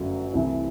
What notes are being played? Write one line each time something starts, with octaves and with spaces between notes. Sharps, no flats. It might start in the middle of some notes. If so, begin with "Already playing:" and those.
Already playing: G1 F#2 F#3 A3
C2 C3 E3 A3